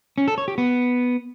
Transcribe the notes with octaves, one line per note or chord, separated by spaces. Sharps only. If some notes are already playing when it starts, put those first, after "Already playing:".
C#4
A4
C#5
G4
B3